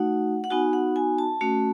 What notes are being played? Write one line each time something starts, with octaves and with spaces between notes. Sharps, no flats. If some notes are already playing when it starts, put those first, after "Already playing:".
Already playing: A3 D#4 F#4 F#5
F#5
B3 D#4 F#4 G#5
F#5
G#5
A5
A3 C#4 F#4